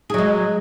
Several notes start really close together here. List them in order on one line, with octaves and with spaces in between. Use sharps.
G#4 F#3 G#3